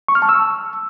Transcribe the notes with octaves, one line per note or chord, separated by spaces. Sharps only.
C#6
F6
A5
E6